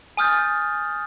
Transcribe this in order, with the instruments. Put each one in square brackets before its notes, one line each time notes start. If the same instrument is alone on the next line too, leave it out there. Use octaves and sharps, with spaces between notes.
[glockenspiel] G#5 D#6 F6 G6 A6